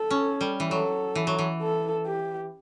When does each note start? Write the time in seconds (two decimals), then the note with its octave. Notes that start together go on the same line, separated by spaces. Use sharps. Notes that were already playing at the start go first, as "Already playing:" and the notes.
Already playing: A4
0.11 C#4
0.41 G3
0.60 E3
0.71 F#3 A4
1.15 E3
1.27 F#3
1.39 E3
1.61 A4
2.06 G4